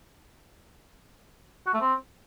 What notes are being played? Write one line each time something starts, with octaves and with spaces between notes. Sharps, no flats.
F#4
A3
C4